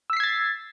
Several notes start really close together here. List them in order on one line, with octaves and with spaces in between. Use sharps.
E6 B6 C7 G#6 A6